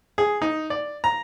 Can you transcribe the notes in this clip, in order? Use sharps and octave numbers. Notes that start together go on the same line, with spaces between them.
G#4
D#4
D5
A#5